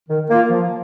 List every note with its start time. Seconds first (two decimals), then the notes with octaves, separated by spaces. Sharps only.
0.09 D#3
0.30 A#3 F4
0.50 F3